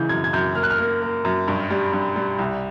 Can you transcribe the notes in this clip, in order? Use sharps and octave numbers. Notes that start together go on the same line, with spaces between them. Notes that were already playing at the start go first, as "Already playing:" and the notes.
Already playing: C#3 E3 G#3 G6
F#2 G#6
G#6
F#2 G6
A#3 F6
F#6
F6
A#3
A#3
F#2
G2
G3
G2
G3
C2